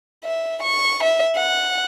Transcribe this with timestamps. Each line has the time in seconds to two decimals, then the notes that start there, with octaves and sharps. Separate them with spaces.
0.24 E5
0.63 C#6
1.03 E5
1.36 F#5